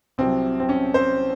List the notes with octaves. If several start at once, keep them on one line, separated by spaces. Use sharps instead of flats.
C2 C3 F#3 C4
C4
C#4
C5